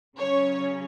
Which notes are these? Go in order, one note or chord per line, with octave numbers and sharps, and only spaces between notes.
C#3 F#3 C#4 C#5